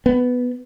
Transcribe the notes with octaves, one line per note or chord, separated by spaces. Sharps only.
B3